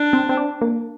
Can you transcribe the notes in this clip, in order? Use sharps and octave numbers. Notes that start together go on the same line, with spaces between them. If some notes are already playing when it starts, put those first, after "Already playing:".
Already playing: D4
C4
C4
D4
A#3